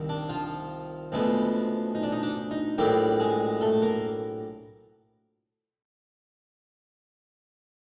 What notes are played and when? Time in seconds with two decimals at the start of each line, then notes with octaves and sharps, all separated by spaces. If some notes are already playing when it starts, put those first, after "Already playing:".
Already playing: C2 C3 D#3
0.09 D4
0.29 F3 F4
1.12 D2 C#3 F3 G#3 B3
1.95 D#4
2.03 D4
2.12 D#4
2.23 D4
2.51 D#4
2.78 A#1 A2 F#3 G3 A#3 G4
3.20 G#3 G#4
3.61 A3 A4
3.82 A#3 A#4